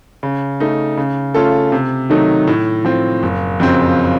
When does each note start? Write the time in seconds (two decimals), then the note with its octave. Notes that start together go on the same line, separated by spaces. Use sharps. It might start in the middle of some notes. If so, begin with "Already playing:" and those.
0.23 C#3
0.60 A3 D#4
0.97 C#3
1.34 A3 C#4 F4 A4
1.72 C3
2.10 D#3 F#3 A3 D#4
2.47 A2
2.85 F3 C4
3.23 F#1
3.60 F2 C#3 F#3 C4